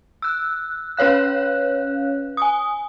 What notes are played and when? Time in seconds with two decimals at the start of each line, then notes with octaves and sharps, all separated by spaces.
0.22 E6 F#6
0.97 C#4 B4 C#5 F5 F#6
2.37 G#5 D#6